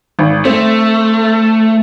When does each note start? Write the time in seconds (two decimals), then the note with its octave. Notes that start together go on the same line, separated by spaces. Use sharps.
0.19 G#1
0.45 A3 C4